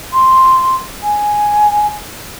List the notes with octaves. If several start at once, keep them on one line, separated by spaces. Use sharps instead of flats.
C6
G#5